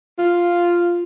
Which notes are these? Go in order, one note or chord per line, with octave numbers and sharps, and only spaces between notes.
F4